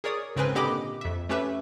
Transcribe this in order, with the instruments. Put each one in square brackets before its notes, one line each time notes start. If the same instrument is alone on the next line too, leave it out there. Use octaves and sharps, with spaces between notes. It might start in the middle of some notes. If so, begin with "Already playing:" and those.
[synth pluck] G#4 A#4 C#5 D5 D#6
G#1 C#3 C4 A#4 B4 G#5
A#2 D3 G4 D#5 B5 D6
F2 E5
A3 C#4 G4 B4 E5